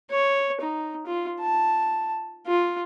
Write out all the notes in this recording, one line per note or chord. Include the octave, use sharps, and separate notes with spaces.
C#5
D#4
F4
A5
F4